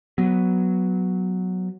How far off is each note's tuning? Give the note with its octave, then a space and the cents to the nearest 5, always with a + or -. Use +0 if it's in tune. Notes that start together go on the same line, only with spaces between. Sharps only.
F#3 +0 B3 +0